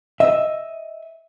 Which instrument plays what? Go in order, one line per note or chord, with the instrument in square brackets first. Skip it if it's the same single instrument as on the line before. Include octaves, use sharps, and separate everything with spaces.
[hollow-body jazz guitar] D#5 E5